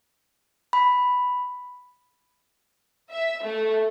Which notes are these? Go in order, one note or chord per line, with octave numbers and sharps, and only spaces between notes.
B5
E5
A3